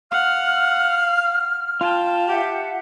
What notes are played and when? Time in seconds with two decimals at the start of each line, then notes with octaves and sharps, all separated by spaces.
0.12 F5 F#5 F6
1.81 F4 G5 A5
2.29 G4 E5 F#5